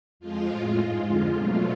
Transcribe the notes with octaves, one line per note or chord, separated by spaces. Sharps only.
F2 F3 G#3 F4
A2 G#3
G#2 G#3
F2 D3 F3 G#3 F4
B2 F#3 A3